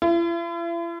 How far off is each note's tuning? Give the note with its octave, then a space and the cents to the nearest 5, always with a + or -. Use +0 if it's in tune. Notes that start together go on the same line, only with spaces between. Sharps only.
E4 +45